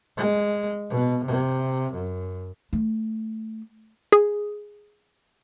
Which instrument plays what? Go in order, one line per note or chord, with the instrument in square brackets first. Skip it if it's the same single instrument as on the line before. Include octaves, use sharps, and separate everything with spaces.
[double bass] G#3
B2
C3
F#2
[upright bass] A3
[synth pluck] G#4